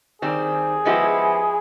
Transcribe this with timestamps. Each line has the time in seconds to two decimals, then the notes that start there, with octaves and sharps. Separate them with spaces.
0.22 D#3 G3 C4 G#4
0.85 F3 G#3 B3 E4 G4